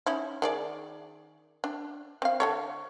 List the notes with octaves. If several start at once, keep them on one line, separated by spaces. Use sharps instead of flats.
C#4 D#4 E4
D#3 G#4 D5
D4
C4 F5
D3 A4 C#5